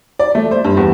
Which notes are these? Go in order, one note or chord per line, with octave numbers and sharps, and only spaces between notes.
D5
A3
C5
G2
E2